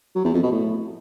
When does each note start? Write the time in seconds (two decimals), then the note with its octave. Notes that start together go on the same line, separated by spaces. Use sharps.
0.15 F#3
0.25 E2
0.34 F2
0.43 B2
0.52 A2